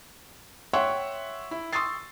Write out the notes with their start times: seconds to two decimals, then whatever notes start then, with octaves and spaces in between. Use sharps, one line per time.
0.73 C#5 E5 F#5 G5 C6 C#6
1.51 E4
1.73 C6 C#6 D#6 E6 A6 C7